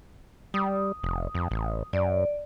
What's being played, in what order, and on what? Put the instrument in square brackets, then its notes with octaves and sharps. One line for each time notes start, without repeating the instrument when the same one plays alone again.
[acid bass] G3 [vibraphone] D#6
[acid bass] F1
F2
A1
[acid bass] F#2 [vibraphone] D5